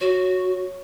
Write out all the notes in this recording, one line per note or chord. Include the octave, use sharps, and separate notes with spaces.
F#4 C#5